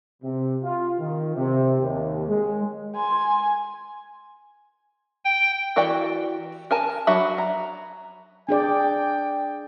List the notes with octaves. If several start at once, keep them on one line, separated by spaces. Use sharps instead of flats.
C3
F4
D#3
C3
D#2
G#3
G#5 C6
G5
E3 F#4 G4 D5 G5
A#4 G#5 A5
F#3 D4 F#4 E5 B5
A#5
D4 G#4 D5 G5